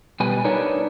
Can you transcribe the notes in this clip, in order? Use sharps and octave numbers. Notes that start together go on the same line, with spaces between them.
B2 G3 G4 B4 G#5
D4 D#4 A#4 B4 C#5